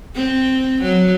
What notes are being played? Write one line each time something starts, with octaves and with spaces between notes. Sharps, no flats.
C4
F#3